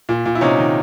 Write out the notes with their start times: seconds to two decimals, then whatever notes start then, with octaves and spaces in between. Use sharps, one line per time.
0.09 A#2
0.26 A#2
0.35 E4
0.41 C3 C#4 D#4
0.58 D#3